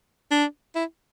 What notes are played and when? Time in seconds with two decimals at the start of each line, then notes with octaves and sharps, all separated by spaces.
0.31 D4
0.75 E4